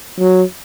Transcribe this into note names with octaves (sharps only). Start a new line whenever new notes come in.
F#3